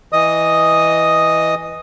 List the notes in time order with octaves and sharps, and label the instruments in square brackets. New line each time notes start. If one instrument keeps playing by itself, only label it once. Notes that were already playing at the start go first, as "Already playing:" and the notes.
[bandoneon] E3 D#5 D#6